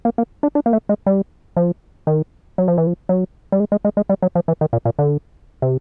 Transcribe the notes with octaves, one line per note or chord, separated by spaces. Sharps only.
A#3
A#3
D4
D4
A#3
A3
G#3
G3
F3
D#3
F#3
F3
E3
F3
F#3
G3
G#3
G#3
G#3
G#3
G3
F#3
F3
E3
D#3
A#2
A#2
D3
C3